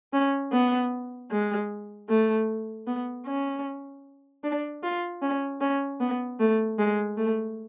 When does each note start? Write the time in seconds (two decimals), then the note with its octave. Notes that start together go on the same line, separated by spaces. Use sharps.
0.13 C#4
0.52 B3
1.31 G#3
2.09 A3
2.87 B3
3.27 C#4
4.44 D4
4.83 F4
5.22 C#4
5.61 C#4
6.00 B3
6.40 A3
6.79 G#3
7.17 A3